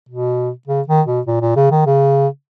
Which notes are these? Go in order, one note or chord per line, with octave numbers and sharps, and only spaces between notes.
B2
C#3
D#3
B2
A#2
A#2
C#3
D#3
C#3